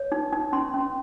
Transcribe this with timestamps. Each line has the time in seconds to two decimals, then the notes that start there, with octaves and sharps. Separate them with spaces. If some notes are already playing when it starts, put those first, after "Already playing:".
Already playing: C#5
0.12 D#4
0.33 D#4
0.53 C#4 C6
0.74 C#4